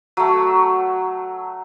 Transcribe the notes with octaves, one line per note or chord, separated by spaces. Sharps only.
F#3 A3